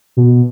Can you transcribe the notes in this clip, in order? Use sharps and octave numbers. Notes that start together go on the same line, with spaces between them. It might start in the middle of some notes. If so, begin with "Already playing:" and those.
B2